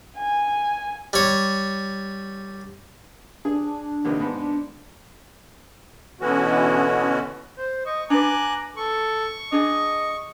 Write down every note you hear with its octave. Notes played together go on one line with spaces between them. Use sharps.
G#5
G3 C#5
D4 G#4
A#1 C3 D#3
G#2 B3
B2 D3 E3 B3 C#4 F#4
C5
D#5 C#6
D4 B4 G#5 A#5 D6 F#6
A4 C#6
D4 G#4 D#5